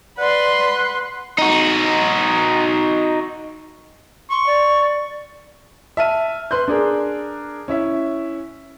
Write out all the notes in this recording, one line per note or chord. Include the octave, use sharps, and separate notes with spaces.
B4 D5 F#5 C6
D#4 F#4
C6 C#6
D5
E5 A5 F6 D#7
B4 C6 F#6 G6
D4 G#4 A#4
C#4 E4 E5